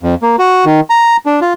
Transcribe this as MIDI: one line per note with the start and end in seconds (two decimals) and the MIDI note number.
0.03 0.15 41
0.22 0.36 58
0.39 0.65 66
0.65 0.80 51
0.90 1.17 82
1.26 1.40 62
1.41 1.53 65